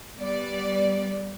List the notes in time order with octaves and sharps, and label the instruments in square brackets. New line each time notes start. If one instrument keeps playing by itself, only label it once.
[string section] G3 B3 D5